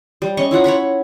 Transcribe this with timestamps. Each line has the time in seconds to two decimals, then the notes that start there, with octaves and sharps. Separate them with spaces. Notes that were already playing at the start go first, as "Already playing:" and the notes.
0.22 G3
0.37 C#4 D#5 C#6
0.51 E4 F4 F#5 A#5
0.64 C#5 F#5 B5 C#6